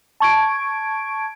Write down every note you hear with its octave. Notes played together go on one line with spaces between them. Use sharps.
A5 C#6 G#6 D7